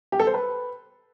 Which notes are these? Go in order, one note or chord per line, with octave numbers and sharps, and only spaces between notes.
G4
A4
C5
B4